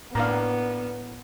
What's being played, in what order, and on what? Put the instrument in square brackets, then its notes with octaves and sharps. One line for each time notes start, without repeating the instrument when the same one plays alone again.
[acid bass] A2 [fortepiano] A#3 D4 F5 [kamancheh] B3